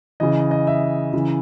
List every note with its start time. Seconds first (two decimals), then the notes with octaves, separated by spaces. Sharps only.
0.20 C#3 E3 D#5
0.51 D#5
0.67 E5
1.13 C#3 E3